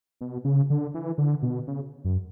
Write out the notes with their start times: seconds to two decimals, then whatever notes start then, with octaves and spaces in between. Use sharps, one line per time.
0.21 B2
0.44 C#3
0.70 D3
0.94 E3
1.18 D3
1.42 B2
1.67 C#3
2.04 F#2